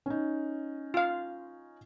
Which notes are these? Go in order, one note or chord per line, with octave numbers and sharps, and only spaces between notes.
C#4 D#4
F4 F5